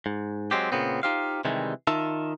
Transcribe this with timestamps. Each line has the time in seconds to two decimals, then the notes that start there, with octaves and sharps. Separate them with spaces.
0.06 G#2
0.51 F#3 G#3 C4 G4
0.72 A#2 C#3 B3 C4
1.03 D#4 F4 G4 C5 F5
1.45 C3 D#3 E3 G3 G#3
1.87 D#3 D#4 F4 E5 A5